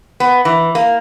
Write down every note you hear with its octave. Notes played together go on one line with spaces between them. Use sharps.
B3
E3
A#3